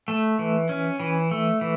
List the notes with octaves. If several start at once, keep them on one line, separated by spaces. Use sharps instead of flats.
A3
E3
C#4
E3
A3
E3